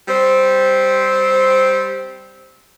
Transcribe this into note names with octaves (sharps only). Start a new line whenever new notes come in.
G3 C4 C5